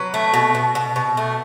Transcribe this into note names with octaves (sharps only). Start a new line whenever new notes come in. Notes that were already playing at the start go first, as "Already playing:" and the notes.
Already playing: F#3 B4
A3
B2
B2
B2
B2
A3